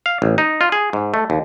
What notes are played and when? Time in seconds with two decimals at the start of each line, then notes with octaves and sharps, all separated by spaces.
0.06 F5
0.22 A1
0.38 D#4
0.61 F4
0.72 G#4
0.93 G#2
1.14 A3
1.30 D#2